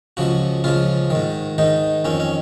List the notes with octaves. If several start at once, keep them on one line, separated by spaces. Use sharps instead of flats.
C#2 C#3 F3 F#4
C#2 C#3 F3 F4
G#2 D#3
G#2 D#3 D#4
F2 D#3 C#4
C#4